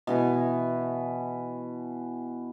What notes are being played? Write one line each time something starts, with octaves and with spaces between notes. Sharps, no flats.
B2 E3 B4 G#5